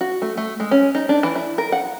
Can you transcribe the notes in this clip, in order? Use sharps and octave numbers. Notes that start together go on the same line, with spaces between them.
F#4
A3
A3
G#3
C#4
D#4
D4
E3
E4
A#4
F#5